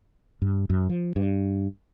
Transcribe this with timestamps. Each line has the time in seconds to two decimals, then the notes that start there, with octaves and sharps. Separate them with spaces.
0.42 G2
0.70 F#2
0.89 F3
1.16 G2